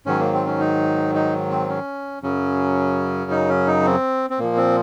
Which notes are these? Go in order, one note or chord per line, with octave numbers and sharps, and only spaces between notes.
G#2 D#3 F#3 C#4
A#3
C4
C#4
D#4
D#4
C4
C#4
F#2 C#3 F#3 C#4
D#4
C#4
D#4
C4
C4
A#2 F3 A#3
C4